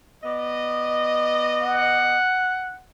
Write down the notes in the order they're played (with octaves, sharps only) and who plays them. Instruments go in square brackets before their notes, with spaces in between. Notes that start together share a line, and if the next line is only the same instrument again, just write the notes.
[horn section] B3 D5 D#5
[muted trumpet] F#5